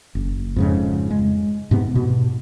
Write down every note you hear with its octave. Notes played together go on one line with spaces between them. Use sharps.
F#1
F2 G#2 C#3
G#3
G#2 C3 B3
G#2 B2